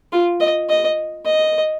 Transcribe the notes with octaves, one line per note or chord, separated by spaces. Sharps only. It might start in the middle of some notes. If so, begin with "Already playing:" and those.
F4
D#5
D#5
D#5